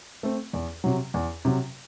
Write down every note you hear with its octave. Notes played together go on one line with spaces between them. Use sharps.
A3 C4
E2
C3 F#3
E2
C3 F#3